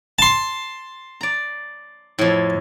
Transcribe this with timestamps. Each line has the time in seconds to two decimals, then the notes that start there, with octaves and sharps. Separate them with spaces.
0.19 A5 C6
1.21 D5 A#5
2.19 F2 A2